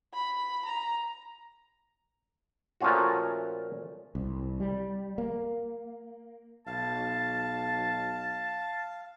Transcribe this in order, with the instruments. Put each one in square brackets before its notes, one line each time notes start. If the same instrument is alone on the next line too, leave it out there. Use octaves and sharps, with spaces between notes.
[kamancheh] B5
A#5
[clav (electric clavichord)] A#2 F3 A3 C#4 F4 F#4
[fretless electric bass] C2
G3
A#3
[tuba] B1 [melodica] F5 [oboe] A5